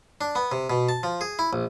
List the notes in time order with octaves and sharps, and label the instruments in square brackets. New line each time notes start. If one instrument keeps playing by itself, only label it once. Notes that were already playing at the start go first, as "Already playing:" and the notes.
[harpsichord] D4
B3
C3
B2
A5
F3
G#4
E4
A#1